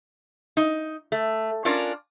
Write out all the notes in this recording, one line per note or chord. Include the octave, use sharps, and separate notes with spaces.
D#4
A3
C#4 D4 F4 A#4 D5